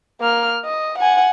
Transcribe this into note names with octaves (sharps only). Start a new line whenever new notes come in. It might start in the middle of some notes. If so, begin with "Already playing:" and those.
A#3 F6
D#5
F#5 G#5